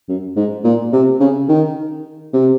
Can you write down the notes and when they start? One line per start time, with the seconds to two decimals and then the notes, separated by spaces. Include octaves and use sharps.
0.09 F#2
0.36 G#2
0.64 A#2
0.93 C3
1.20 C#3
1.49 D#3
2.33 C3